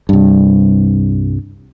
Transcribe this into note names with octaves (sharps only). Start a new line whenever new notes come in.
C2 G2